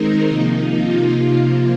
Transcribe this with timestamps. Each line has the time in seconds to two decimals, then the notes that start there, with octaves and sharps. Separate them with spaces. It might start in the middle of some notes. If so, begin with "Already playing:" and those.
Already playing: D#3 G#3 C4 D#4 A#4
0.28 C3 F3 A#3
0.69 F4
1.10 C3 F3 A#3 F4